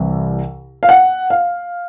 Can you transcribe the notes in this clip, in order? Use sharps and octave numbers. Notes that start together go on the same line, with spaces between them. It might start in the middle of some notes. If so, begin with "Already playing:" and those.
Already playing: C2 C3 E3
F5
F#5
F5